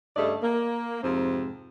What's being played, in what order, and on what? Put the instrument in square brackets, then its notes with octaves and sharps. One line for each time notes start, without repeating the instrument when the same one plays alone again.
[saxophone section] G2 C#3 A3 D5 D#5
A#3
F2 G#2 C3 C4